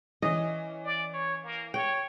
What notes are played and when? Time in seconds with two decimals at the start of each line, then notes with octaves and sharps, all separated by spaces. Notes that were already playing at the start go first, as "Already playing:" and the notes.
0.22 E3 C#4 D#5
0.84 D5
1.14 C#5
1.44 A#3
1.74 C#5 G5